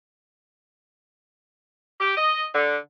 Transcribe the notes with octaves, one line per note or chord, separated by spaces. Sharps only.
G4
D#5
D3